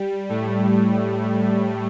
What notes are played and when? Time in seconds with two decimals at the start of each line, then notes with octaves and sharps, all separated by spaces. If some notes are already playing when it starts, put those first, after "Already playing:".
Already playing: G3
0.29 A2 A3